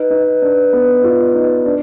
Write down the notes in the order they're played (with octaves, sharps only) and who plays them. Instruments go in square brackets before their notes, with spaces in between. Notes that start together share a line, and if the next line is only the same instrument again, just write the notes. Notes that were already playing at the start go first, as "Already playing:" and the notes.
Already playing: [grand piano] D#4 [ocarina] B4
[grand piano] D#4
D4
B3
F4
D#4
D4